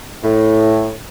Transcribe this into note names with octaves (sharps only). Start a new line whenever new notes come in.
A2